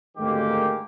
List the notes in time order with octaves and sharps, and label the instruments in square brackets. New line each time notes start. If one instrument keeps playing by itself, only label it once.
[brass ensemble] G#1 D2 D#3 G#3 A#3 G4